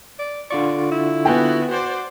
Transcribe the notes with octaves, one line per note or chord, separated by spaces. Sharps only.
D5
D3 F4 D5 C#6
E4
B3 F#4 G5 G#5
F#4 C5 D5